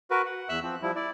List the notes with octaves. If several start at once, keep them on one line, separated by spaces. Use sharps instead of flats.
F#4 A#4 B4
F#5
E2 E5 E6 F#6
F3 C4
F3 G3 E4
E4 D5